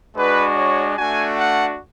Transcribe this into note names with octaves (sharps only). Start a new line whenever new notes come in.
G#3 D4 F#4 B4
C#5
A3 D4 F#4 G#5
F#5